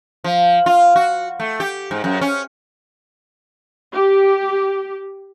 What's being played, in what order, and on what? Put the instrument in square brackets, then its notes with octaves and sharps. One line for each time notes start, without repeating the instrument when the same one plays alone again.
[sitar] F3
F4
F#4
A3
G4
G#2
F#2
C#4
[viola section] G4